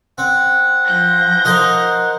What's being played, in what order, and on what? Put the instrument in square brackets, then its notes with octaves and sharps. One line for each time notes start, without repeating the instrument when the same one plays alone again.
[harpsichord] C4 [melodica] F#5
[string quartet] F3 G6 A#6
[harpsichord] D#4 A#4 C5